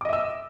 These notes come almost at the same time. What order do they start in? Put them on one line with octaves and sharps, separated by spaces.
D6 D#5 E5 E6